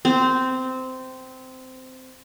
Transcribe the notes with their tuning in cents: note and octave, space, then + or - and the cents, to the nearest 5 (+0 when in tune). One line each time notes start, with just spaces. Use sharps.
C4 -15